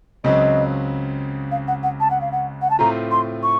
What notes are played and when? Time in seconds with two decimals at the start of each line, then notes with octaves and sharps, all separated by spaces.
0.24 C#2 C#3 F#3 C4 D#5
1.51 F5
1.68 F#5
1.83 F#5
2.00 A5
2.10 F#5
2.21 F5
2.32 F#5
2.62 F#5
2.70 A5
2.79 A2 A3 C4 F4 A#5
3.11 C6
3.43 C#6